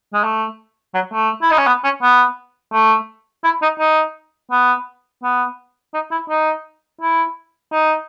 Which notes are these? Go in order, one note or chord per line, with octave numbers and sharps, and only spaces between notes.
G#3
A3
F#3
A3
E4
D#4
C#4
B3
C#4
B3
A3
E4
D#4
D#4
B3
B3
D#4
E4
D#4
E4
D#4